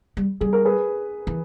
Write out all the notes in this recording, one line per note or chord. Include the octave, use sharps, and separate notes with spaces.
G3
G3 G#4
A#4
G#4 B4
E3